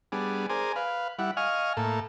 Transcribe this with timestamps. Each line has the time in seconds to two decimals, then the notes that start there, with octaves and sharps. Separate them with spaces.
0.12 G3 B3 D4 G#4
0.50 G#4 A#4 C5 D5 G#5
0.76 B4 F5
1.19 G3 E4 F#5
1.37 D#5 F5 G#5 C#6 F6
1.77 A2 A#3 A4